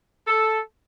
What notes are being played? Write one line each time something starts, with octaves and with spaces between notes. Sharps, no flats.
A4